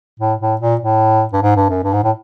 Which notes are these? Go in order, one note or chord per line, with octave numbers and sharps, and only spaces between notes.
A2
A2
A#2
A2
G2
G#2
G2
F#2
G2
G#2
A2